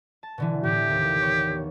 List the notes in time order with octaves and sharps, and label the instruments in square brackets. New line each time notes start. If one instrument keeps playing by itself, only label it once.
[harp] A5
B2 D3 E3
[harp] A2 E3 [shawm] G4
[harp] D#2 C3
B3 C#5